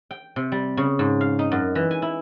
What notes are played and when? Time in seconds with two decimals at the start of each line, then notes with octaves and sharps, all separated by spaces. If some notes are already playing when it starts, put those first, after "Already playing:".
0.11 G5
0.36 C3
0.52 G3
0.77 C#3
0.99 G#2
1.21 F5
1.39 D#4
1.52 F#2
1.75 E3
1.91 G#5
2.02 E4